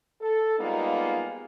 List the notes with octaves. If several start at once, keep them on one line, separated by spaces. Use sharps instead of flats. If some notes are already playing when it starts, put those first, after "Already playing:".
A4
G3 G#3 A#3 B3 D#4 F4